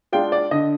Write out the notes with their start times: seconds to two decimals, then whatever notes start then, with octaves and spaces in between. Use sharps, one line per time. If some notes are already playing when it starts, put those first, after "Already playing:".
0.12 G#3 D4 F4 G5
0.32 D5
0.51 D3 D#5